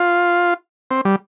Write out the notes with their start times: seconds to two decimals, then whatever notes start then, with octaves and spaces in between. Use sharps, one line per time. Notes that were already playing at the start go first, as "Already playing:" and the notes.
Already playing: F4
0.91 C4
1.05 G3